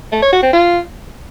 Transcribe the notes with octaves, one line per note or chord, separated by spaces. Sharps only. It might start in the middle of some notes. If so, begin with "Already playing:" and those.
A3
C#5
F#4
C4
F4